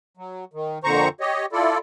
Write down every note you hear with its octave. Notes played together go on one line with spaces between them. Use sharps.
F#3
D#3
F2 A#2 D3 C5 A#5 C#6
G4 C#5 D#5
E4 F4 A4 D5